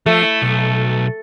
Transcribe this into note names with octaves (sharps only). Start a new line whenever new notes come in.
F3 A3
E4
B1